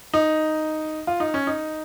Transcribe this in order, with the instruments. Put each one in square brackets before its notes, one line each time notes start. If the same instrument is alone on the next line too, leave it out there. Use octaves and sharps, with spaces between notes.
[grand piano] D#4
F4
D#4
C#4
D#4